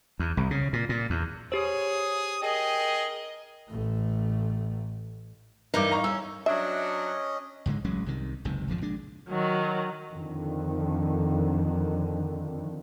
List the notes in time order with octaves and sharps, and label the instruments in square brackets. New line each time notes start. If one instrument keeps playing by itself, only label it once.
[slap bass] E2
C2
C#3
A#2
A#2
E2
[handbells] G4 C5 [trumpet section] G#4 D#6 [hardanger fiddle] C#5
[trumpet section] G#4 [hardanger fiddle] A#4 D#5 [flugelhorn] G5
[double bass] A1 A3
[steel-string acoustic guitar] G2 E3 D#4 [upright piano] A#4 D6
[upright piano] F5 A#5 C#6
[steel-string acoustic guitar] C#4 [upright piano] E6
[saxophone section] F#3 D4 [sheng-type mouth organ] C#4 D#5 [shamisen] E5
[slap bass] C#2 G#2 D3 G#3
A1 F#3 G#3 C#4
C2 C3 D#3
F#1 C#2 C3 D#3
G#1 F2 D3 F3
A#1 G#3 D4
[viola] D#3 F#3
[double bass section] F2 D3 D#3